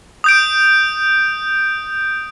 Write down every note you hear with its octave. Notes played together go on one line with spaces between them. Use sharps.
D#6 G6 D7